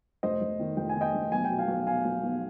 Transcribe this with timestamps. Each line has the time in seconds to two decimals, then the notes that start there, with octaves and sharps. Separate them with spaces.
0.23 F1 C5 D#5
0.42 F1
0.60 D#3
0.77 F1 G5
0.89 G#5
0.96 D#3
1.01 D#5 G5
1.14 F1
1.32 B1 G#5
1.45 B2 G5
1.59 F5 G#5
1.68 B1
1.86 B2 F5 G#5
2.05 B1
2.23 B1